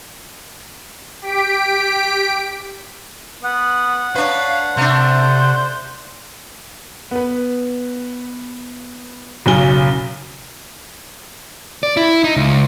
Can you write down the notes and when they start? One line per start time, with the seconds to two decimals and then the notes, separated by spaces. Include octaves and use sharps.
1.22 G4 B6 D7
3.44 B3 F#5
4.15 D4 B4 C#5 F5
4.77 C3 A3 D4 C5
7.11 B3 B4
9.46 F#1 B1 C#3 F#3 G#5 G7
11.83 D5
11.97 E4
12.24 D#4
12.36 C#2